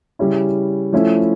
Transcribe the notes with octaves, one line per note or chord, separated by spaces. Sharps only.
C#3 G3 C#4 E4
F3 A3 C#4 E4